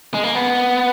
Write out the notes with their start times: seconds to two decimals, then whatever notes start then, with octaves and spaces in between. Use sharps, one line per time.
0.14 G#3
0.24 A#3
0.35 B3